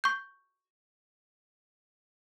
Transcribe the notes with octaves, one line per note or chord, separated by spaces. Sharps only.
C#6 G6